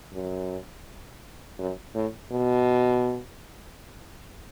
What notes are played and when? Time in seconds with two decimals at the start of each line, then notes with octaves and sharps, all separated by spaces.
0.13 F#2
1.59 F#2
1.95 A2
2.31 B2